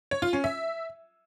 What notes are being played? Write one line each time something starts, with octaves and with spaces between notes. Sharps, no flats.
C#5
F4
C#4
E5